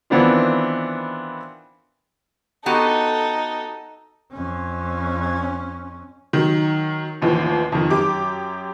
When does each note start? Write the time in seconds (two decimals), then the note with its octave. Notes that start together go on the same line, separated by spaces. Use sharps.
0.10 D#3 E3 B3 C4 D4 F4
2.66 B3 D#4 F#4 G4 A4
4.32 F2 C#4
6.33 D#3 F#3
7.22 A1 D#2 E3 F3
7.72 F2 D#3
7.90 F#2 G4 D6